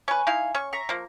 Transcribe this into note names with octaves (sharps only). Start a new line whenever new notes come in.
C#4 B4 G#5 C#6
D#4 E4 F5
C#4 C#6
E5 A#5 C#6
F3 A#3